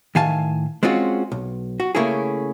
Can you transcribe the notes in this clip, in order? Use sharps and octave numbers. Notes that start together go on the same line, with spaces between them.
A2 D#3 F5 G#5 A5
G#3 C4 C#4 F4 F#4
B1
F#4
C#3 A3 A#3 C#4 E4 G#4